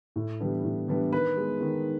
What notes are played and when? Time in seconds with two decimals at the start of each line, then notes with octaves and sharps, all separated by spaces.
0.16 A2
0.40 E3 G3 B3 D4
0.64 A2
0.88 E3 G3 B3 D4
1.12 D#3 B4
1.37 G#3 B3
1.61 D#3